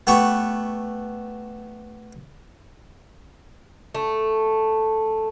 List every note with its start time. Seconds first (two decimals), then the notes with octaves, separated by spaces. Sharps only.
0.07 A3 B3 G4 C#6
3.95 A3